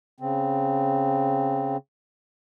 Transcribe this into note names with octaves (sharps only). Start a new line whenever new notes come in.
C#3 C4